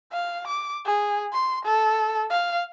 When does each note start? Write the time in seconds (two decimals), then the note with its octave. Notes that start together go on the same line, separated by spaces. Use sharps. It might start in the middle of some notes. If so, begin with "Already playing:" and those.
0.12 F5
0.47 D6
0.86 G#4
1.33 C6
1.65 A4
2.31 F5